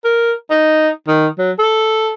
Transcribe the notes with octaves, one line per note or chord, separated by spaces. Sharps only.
A#4
D#4
D#3
F#3
A4